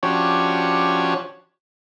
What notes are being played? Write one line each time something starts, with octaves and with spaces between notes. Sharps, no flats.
F3 C#4 D4 F#4 G4 C#5